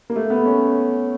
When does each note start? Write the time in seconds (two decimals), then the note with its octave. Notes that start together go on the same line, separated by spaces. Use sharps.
0.10 A#3
0.16 A3
0.30 B3
0.45 C#4